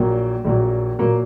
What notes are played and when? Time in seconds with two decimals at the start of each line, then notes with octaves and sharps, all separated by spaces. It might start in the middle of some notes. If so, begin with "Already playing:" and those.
Already playing: A#1 A#2 F#3 A#3
0.45 A#1 A#2 F#3
0.99 A#2 F#3 A#3